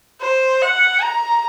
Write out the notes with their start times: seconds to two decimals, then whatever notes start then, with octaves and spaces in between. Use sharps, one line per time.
0.21 C5
0.62 F#5
1.02 A#5